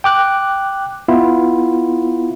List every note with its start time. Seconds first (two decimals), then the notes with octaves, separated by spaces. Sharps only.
0.04 G5 D6 F#6
1.08 B3 E4 F4